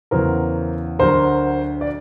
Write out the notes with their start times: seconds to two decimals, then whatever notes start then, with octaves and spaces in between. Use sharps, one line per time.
0.11 E2 C#3 F#3 A#4 C5
0.99 D2 D3 F#3 A#4 C5
1.81 D5